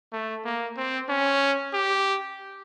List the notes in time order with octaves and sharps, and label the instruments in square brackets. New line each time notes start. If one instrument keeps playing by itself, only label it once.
[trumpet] A3
A#3
C4
C#4
G4